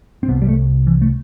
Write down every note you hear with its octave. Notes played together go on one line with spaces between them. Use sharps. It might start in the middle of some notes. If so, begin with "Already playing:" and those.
C4
C2 C3 B3
G3
A3
E3
A3